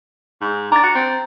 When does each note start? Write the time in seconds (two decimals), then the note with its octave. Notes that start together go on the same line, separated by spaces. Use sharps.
0.41 G#2
0.72 D4 A#5 A6
0.83 F#4
0.95 C4